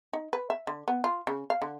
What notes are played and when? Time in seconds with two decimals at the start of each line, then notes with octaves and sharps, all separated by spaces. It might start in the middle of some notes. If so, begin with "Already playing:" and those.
0.13 D#4
0.33 B4
0.50 E5
0.67 D3
0.88 B3
1.04 F4
1.27 C#3
1.50 F5
1.62 D3